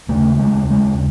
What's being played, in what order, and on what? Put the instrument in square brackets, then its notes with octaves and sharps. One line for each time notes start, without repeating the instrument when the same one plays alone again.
[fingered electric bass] D#2 C#3 A3
G#3
G#3